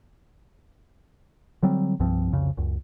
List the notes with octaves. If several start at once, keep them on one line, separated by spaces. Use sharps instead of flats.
D3 F#3 G3 C4
C2 G2 F3 C4
C2 F2 C#3
C#2 F#2